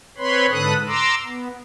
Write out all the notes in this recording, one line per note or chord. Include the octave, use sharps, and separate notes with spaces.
C4 B4 C#5 B5 C6
G#2 D3 A4 B4 D#6 F#6
A#5 C6 D6 E6
B3